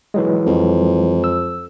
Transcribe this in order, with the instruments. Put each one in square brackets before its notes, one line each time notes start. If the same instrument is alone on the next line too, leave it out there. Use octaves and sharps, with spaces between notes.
[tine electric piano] E3 F#3 G#3
[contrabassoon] F2
[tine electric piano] E6